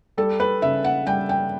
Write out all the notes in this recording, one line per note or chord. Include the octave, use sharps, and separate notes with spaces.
G3 A4
B4
C#3 E5
F#5
G3 G5
G5